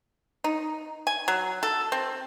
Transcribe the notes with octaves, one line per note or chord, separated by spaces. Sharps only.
D#4
G#5
F#3
A4
C4